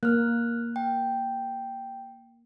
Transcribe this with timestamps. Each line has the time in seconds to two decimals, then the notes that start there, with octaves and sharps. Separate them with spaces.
0.03 A#3 F6 F#6
0.76 G5